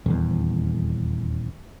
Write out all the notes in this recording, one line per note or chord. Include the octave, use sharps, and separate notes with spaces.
D#1 E2